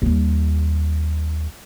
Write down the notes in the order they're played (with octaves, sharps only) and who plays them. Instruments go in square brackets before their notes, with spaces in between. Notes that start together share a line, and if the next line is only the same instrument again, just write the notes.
[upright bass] D#2 G3